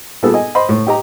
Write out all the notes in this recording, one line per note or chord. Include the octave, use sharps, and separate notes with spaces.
A#2 G3 B3 G#4 A4
D#5 G#5
C5 D#5 B5 C6
A2
G4 D#5 A#5